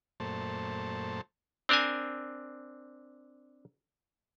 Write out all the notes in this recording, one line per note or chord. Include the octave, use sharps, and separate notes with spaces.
F#2 A#2 A3 C5 A5
C4 D4 A#4 C5 G#5